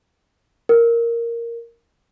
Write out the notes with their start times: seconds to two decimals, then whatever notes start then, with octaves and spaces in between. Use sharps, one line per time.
0.69 A#4